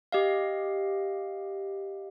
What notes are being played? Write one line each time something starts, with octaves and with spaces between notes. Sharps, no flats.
G4 D#5 F5